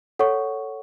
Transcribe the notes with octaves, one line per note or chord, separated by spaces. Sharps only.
A4 C#5 F#5 C#6